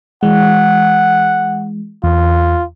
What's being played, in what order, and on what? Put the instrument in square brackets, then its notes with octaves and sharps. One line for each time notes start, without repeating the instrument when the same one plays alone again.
[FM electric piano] E3 G#3 [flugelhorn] F#5
[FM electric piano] E2 [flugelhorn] F4